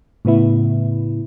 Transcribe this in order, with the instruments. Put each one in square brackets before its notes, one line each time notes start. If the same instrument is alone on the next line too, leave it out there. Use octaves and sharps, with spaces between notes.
[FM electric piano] A2 C#3 B3 E4